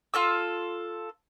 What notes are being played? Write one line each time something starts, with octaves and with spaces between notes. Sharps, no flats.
F4 A4 E6